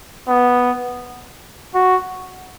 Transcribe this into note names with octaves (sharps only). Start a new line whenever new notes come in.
B3
F#4